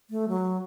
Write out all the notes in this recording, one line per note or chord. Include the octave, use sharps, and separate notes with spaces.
A3
F#3